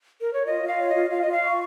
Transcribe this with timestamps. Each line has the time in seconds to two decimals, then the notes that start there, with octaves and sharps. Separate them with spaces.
0.21 A#4
0.33 C#5
0.46 F4 D#5
0.62 F4
0.68 F5
0.78 C#5
0.89 D#5
0.95 F4
1.10 F4 F5
1.22 F4 D#5
1.32 F5
1.43 C#6